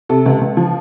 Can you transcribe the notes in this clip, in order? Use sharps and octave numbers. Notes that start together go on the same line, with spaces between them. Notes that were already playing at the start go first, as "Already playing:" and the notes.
C3 A4
C#2
C#2
F3